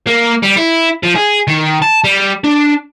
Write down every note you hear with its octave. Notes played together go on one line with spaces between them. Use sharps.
A#3
G3
E4
F3
G#4
D#3
A5
G3
D4